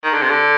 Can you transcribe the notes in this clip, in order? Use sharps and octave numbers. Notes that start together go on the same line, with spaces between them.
D#3
D3
C3
D3